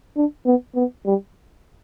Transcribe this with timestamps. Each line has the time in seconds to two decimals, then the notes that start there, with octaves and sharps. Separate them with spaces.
0.16 D4
0.46 B3
0.75 B3
1.06 G3